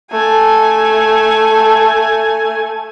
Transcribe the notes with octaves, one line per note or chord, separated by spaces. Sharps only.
A3 G#5